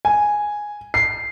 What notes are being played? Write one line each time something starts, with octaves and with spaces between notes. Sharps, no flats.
G#5
C7